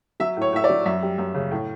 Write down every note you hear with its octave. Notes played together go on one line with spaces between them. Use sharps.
F#3 E5
A2 C#5
A2 E5
D5
F#3
F#2 E5
G3
F#2
C#3
A2